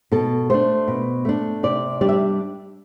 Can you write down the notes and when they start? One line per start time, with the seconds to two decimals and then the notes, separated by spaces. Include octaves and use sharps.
0.12 B2 A4
0.50 A3 D4 C5
0.88 B2
1.25 A3 D4
1.63 C3 D5
2.01 G3 D4 D5
2.09 E5